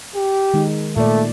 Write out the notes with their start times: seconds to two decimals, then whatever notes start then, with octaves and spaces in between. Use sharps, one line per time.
0.15 G4
0.54 D#3 G#3 D#4
0.96 A#2 A3 D5